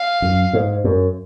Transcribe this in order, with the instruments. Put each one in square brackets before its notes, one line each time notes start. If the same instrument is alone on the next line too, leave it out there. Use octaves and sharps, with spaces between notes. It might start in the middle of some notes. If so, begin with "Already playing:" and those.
Already playing: [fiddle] F5
[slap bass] F#2
G#2
F#2